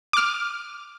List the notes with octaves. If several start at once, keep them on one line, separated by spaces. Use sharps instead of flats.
D6 F6